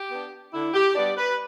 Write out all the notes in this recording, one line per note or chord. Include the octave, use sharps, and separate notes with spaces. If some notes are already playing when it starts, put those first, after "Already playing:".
Already playing: G4
B3 D4
D3 E4
G4
G3 B3 D4 D5
B4